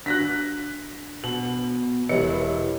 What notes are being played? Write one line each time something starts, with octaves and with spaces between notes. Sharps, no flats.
D4 F#4 F#6 A#6 B6
B2 F#7
E1 E3 G4 C#5 D#5 C#7